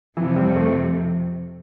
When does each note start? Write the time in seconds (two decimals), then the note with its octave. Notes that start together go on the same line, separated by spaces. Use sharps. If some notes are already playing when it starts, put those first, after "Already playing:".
0.17 F2 C3 E3 F3
0.36 G3
0.56 A3